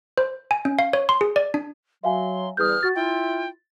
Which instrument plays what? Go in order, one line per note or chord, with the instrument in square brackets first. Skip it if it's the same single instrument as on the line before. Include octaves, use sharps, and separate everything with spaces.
[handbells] C5
G#5
C#4
F5
C#5
C6
G#4
D5
D4
[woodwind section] F#3 [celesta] E5 F5 G#5 [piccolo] C6
[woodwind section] E2 G3 [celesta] D#6 G6 [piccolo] F6
[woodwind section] F#4 [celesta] A6
[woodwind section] E4 F4 [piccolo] G5